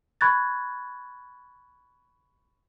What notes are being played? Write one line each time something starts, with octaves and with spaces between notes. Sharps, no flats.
B5 C#6 F#6 G#6 A6